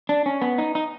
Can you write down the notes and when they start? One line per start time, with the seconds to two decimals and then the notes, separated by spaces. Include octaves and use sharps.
0.09 D4
0.26 C#4
0.42 B3
0.58 D#4
0.75 D#4